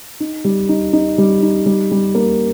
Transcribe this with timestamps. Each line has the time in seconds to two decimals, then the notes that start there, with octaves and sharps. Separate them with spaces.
0.20 D#4
0.44 G3
0.69 D#4
0.93 D#4
1.18 G3
1.42 D#4
1.66 G3
1.91 G3
2.15 A#3